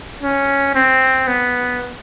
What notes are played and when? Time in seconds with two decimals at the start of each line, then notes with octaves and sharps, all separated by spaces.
0.21 C#4
0.75 C4
1.27 B3